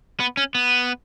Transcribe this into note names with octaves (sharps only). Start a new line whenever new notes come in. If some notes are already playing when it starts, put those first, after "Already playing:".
B3
C#4
B3